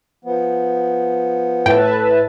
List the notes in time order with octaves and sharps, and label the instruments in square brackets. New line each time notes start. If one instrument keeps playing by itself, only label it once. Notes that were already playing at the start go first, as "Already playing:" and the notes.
[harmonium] F3 B3
[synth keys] A2 [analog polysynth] B4 E5 A5 [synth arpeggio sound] G5